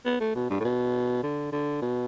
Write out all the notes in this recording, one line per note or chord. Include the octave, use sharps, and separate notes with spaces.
B3
A3
B2
G2
A2
B2
D3
D3
B2